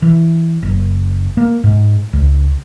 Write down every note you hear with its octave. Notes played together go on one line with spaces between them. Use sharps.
E3
F#1
A#3
G#2
C#2